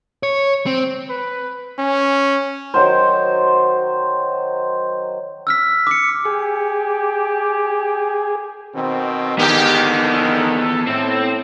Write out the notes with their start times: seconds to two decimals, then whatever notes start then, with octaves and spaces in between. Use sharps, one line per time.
0.23 C#5
0.66 C4
1.09 B4
1.79 C#4
2.74 D#3 F#3 C5
5.47 E6 F6 B6
5.87 D6 C#7
6.25 G4 G#4
8.75 B2 D#3 C4
9.39 G#2 D3 D#3 B3 G4 G#4
10.04 A4
10.87 A2 C4